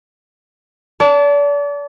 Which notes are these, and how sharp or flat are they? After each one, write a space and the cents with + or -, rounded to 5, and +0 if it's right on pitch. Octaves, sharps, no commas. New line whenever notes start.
D5 -35 A5 +0